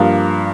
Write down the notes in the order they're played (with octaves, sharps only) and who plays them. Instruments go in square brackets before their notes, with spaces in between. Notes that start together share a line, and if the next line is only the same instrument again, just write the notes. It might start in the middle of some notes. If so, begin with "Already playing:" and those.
Already playing: [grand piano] G2 F3 A#3 F5